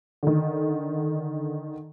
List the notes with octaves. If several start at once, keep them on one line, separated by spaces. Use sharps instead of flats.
D3 D#3